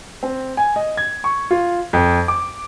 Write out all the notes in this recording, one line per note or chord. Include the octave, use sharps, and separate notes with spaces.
C4
G#5
D#5
G#6
C#6
F4
F2
D6